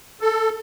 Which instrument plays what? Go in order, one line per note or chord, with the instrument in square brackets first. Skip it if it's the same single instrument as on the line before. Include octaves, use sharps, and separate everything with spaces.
[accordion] A4